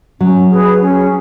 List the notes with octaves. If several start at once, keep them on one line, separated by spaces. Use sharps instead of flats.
F#3 C#4
G#4 B4
C#4